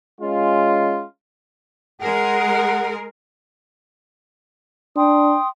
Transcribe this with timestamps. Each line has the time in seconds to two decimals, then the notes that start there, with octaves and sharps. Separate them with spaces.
0.20 G#3 C#4 F4
2.01 G#3 G#4 A#4 F#5
4.96 D4 G5 C6 D#6